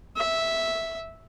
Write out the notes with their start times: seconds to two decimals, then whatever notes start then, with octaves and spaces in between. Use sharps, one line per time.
0.17 E5